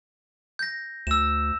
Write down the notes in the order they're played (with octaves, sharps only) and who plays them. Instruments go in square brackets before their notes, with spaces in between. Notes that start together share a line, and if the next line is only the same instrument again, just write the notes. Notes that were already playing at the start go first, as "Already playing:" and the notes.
[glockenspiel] G6 A#6
[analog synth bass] D2 [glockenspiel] E6 E7